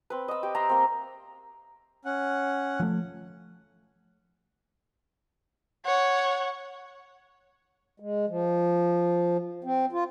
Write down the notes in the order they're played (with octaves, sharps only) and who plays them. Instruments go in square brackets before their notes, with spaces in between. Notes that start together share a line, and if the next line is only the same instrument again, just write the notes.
[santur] C4 B4
D#5 E6
G4
E5 A#5 C6
A#3 C4
[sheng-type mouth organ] C#4 F#5
[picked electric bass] F3 A3
[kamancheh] C#5 F#5
[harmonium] G#3
F3
C4
F4